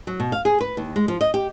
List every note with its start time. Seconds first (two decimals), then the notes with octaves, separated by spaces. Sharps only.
0.07 F#3
0.20 B2
0.32 F5
0.45 G#4
0.61 B4
0.77 D#2
0.96 G#3
1.08 F3
1.21 D#5
1.34 G4